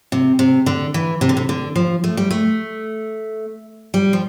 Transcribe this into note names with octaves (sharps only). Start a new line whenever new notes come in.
C3
C3
D3
E3
C3
D3
C3
D3
F3
A3
G3
A3
G3
F3